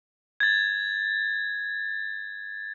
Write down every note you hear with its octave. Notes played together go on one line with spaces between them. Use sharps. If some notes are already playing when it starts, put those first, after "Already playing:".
G#6 A6